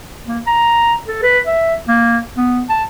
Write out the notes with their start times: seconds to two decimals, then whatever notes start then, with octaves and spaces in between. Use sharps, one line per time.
0.27 A#3
0.47 A#5
1.08 A4
1.23 B4
1.47 E5
1.88 A#3
2.37 B3
2.69 A5